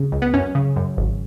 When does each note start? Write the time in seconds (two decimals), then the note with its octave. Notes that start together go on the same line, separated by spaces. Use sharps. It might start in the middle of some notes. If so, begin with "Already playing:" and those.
Already playing: C#3
0.12 C#2
0.22 B3
0.34 F#2 C#4
0.55 C#3
0.76 F#2
0.97 G#1